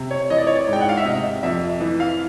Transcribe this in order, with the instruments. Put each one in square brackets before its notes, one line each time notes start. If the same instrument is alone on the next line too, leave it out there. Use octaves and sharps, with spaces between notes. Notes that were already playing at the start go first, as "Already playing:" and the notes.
Already playing: [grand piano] C3
C#5
E3 D#5
D5
C#5
D5
G#2
G5
F#5
F5
E5
C3 D#5
F2 E5
E3
F5